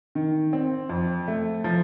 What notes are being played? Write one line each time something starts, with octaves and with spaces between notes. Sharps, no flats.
D#3
C4
F2
A3
F3